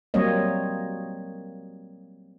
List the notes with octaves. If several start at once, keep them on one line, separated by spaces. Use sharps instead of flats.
F#3 G3 A#3 C4 C#5 D#5